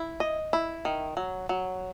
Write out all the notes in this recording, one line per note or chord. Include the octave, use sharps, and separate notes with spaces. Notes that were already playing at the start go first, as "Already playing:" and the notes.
Already playing: E4
D#5
E4
D#3
F#3
F#3